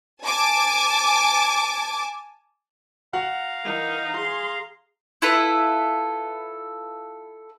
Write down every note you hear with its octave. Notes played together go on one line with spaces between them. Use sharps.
G#5 A5 D6
F#4 F5 F#5 A#5 F#6
E3 D#4 A#4
G#4 C6
E4 F4 A4 B4